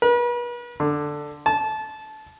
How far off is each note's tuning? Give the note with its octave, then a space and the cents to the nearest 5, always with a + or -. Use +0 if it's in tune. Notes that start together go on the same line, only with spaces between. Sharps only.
B4 -40
D3 +5
A5 -20